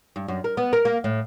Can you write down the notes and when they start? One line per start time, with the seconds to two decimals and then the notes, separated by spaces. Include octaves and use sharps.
0.16 G2
0.28 F#2
0.44 A#4
0.57 B3
0.73 A#4
0.85 A#3
1.04 A2